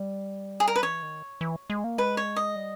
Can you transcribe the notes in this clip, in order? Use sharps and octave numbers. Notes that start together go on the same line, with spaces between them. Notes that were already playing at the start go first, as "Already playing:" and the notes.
Already playing: G3
G#4
A#4
B4
E3 C#5
D#3
E3
G#3
A#3
G#3 B4
C#5
D#5
G3